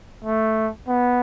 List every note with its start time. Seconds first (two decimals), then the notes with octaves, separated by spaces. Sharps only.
0.24 A3
0.88 B3